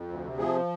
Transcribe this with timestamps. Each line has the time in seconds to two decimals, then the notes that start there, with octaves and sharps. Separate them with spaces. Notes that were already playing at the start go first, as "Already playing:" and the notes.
Already playing: F2
0.09 D2
0.24 C3
0.38 F3 G#4